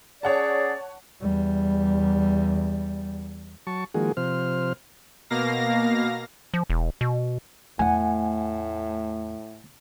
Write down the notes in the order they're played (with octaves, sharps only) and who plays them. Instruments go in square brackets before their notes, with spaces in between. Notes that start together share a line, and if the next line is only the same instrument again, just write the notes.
[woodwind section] C#4 G#4 D5 [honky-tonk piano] C#5 F#5 A5
[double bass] E2 G3
[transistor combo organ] F#3 A5 C#6
D#3 F3 G#3 A#3 F#4 G#4
C3 F3 C5 F6
[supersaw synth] B2 A#3 F5 A#6
[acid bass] F3
E1
B2
[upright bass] E2 A3 [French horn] A2 [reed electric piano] F#5 G#5